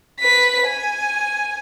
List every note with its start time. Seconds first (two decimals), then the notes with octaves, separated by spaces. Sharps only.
0.21 B4 B6
0.67 G#5